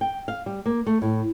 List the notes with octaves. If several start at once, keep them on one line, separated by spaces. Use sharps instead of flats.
G5
F5
G3
A#3
A3
A2